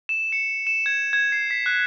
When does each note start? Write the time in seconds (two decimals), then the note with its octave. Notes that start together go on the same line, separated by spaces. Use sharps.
0.09 E7
0.32 C#7
0.67 E7
0.86 G#6
1.13 G#6
1.32 C7
1.51 B6
1.66 F#6